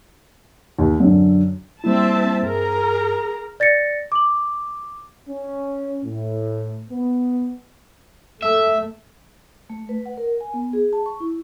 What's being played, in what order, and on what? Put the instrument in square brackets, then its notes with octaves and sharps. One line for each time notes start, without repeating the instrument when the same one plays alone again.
[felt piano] D#2
F#2 D3
[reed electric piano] G3 A#3 E4 [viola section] C4 E5 A5
[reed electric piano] G2 [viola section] G#4 A#4 A#5
[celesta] D5 A6 A#6 C#7
D6 F#7
[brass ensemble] C#4
A2
B3
[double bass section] A3 [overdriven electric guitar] E5
[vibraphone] A3
B4
F#5
A#4
G#5
B3
G#4
A5
C#6
E4